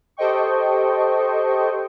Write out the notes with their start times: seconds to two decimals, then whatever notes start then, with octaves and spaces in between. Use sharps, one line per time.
0.17 G4 A4 C5 D#5 G5 C#6